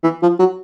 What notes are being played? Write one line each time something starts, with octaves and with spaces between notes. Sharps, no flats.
E3
F3
F#3